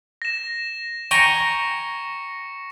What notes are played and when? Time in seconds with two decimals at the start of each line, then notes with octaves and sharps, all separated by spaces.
0.22 A#6 E7
1.11 G5 G#5 A#5 C#6 C#7